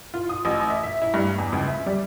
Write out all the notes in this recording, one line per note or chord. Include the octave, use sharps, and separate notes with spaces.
F4
D#6
A1
E5
E5
E4
G2
E2
C#2
E5
G3